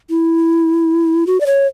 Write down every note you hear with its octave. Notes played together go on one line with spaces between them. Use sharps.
E4
F#4
D5
C#5